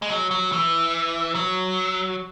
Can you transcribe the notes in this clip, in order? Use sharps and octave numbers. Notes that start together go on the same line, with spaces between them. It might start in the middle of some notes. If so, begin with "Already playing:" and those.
G#3
F#3
F#3
E3
F#3